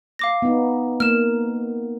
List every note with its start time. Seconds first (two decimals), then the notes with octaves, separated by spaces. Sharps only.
0.19 F5 D6 A#6
0.42 B3 D#4
1.00 A#3 F6 E7